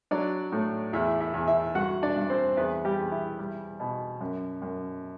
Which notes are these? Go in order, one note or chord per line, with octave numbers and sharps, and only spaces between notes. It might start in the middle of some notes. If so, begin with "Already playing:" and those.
F#3 D4 D5
A2
E2 E4 E5
E4 E5
E2
E4 E5
G2 F#4 F#5
D4 D5
G2
C4 C5
E2 B3 B4
G3 G4
E2
E4
G3
B2
F#2
F#2